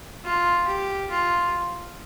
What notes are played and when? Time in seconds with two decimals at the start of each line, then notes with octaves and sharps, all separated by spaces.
0.24 F4
0.67 G4
1.10 F4